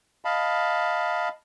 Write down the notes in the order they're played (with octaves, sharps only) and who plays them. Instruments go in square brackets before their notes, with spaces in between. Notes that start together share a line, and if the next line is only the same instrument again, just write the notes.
[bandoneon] D#5 F5 A5 B5